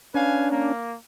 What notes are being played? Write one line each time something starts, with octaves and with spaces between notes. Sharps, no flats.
C#4 D4 B4 F5 G#5
A#3